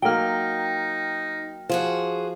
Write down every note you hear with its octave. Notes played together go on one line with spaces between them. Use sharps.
F#3 A#3 D#4 G5 F6
F3 F#4 G#4 C5